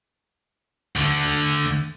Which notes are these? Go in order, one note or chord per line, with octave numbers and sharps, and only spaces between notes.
D2 D3